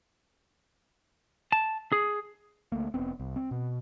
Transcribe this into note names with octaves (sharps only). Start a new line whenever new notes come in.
A5
G#4
D2 A3 A#3
F1 G2 B3 C4
C2
C4
B2